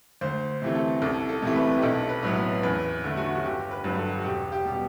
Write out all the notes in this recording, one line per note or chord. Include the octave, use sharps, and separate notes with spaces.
D2 C5
C3 E3 A3
A4
C2 A4
A4
C3 E3 A3
B4
G4
B1 A4
B4
A2 F#3 B3
B4
E2 B4
D3 A3
F#4
F#4
G1 G4
B4
G2 F#3 B4
A4
F#4
E1 G4
G4
B2 G3
G4